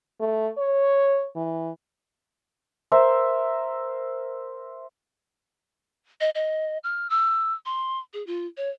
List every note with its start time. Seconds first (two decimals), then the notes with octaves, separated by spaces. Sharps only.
0.20 A3
0.58 C#5
1.36 E3
2.92 A#4 C5 E5
6.21 D#5
6.35 D#5
6.84 F6
7.10 E6
7.66 C6
8.13 G#4
8.27 F4
8.57 C#5